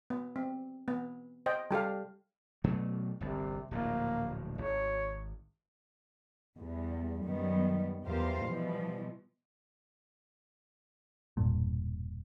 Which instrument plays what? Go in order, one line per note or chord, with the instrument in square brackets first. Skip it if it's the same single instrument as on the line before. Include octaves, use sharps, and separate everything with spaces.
[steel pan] B3
C4
B3
C5 D#5 G5
G3 G4 A4 F5
[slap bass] B2 F#3 A3
[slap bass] G1 C2 [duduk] C3
[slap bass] D1 A#1 A2 [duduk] A#3
[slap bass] G#1 [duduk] C#5
[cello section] E2 G3
F#2 D#3 F#3 G3 B3
E2 F4 G4 A#4 C5 F5
B2 E3 F3 G3
[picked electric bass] E1 G2 A#2